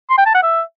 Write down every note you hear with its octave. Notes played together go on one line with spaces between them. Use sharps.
C6
G5
A5
F#5
E5